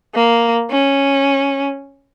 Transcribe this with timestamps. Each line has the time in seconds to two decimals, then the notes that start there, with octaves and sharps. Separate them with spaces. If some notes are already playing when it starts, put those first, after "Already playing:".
0.15 A#3
0.70 C#4